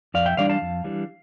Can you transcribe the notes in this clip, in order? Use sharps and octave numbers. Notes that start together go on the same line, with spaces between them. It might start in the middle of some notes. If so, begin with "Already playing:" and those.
F2 D5 F5
E5 G5
E3 G3 D4 D5 F5
F5 A5
F2
E3 G3 D4